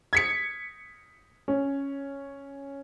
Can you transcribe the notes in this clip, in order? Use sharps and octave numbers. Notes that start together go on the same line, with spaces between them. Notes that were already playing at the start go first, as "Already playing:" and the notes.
G#6 B6 C#7
C#4